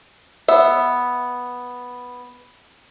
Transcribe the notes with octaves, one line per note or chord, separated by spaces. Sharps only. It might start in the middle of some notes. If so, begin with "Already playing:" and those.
B3 E5